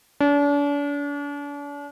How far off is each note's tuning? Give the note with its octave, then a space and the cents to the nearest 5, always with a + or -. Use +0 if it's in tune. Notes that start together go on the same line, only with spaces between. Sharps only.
D4 -40